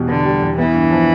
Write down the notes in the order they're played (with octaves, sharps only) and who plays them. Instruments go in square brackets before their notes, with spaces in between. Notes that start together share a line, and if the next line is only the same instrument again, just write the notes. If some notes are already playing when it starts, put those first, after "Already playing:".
Already playing: [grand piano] E2 B2 G3
[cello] D3 [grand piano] B3
[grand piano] G3
E2
[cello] E3 [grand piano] B3
[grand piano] G2
F3